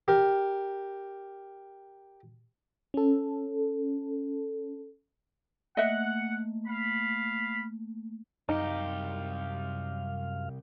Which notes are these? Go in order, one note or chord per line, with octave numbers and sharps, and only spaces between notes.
G4 A#4
C#4 A4
A3 A#3 D#5 E5 F#5
F5 B5
C2 F#2 D#4 G4 F5